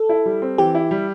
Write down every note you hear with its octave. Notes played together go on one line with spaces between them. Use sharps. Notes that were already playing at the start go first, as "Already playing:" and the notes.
Already playing: A4
E4
G3
C4
E3 G4
E4
G3